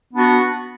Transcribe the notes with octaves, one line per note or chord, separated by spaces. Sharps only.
B3 D4 F#4